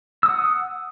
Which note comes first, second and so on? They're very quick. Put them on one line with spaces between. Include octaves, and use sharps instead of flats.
E6 D#6 F#5